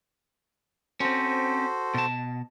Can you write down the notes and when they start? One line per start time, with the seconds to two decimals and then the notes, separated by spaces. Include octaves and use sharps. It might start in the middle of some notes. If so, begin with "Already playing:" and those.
1.00 C4 C#4 F#4 A4 C5
1.94 B2 A5